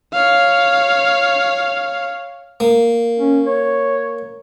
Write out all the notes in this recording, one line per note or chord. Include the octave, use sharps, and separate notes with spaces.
C#5 F5
A#3
C#4
C#5